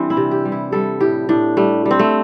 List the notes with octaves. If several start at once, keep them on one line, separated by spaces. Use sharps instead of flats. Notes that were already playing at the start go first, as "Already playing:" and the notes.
Already playing: E3 G3 C4 D4
E4
C3
G4
G3
E4
G3 A4
A2 G4
A2 D4
G3 A3
G3
C4
A3